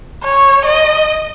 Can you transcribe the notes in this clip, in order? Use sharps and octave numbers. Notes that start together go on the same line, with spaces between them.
C#5
D#5